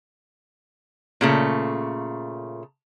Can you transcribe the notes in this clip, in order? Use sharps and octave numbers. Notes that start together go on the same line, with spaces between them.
A#2 C#3 A3